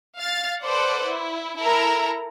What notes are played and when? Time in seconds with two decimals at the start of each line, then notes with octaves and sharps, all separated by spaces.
0.19 F5 A6
0.63 A4 B4 C5 D5 F#5
1.06 E4
1.58 E4 A4 A#4 A#5